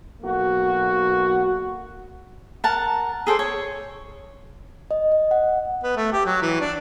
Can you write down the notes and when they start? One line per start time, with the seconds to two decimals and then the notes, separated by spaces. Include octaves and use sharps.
0.23 B1 A#3 F#4
2.64 A#4 F#5 A5
3.27 G#4 A4 C5 D5
3.39 C#5
4.91 D#5
5.12 D#5
5.31 F#5
5.84 B3
5.96 A3
6.12 G4
6.26 F#3
6.42 E3
6.61 D4